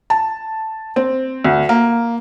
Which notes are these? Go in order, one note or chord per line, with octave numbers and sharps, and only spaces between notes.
A5
C4
D2
A#3